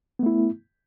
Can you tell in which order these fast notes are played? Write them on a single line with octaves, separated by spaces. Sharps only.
B3 A3 E4